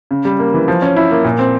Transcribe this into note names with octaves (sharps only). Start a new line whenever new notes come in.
C#3
G3
A#3
E3
F3
C#4
E4
A#3
A#2
C4